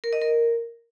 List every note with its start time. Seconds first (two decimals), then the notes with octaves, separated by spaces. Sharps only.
0.04 A#4
0.13 D#5
0.21 A#4